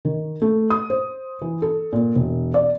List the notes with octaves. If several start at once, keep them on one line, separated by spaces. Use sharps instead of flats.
D#3
A3
D#6
C5
E3
A4
A#2
E1
D5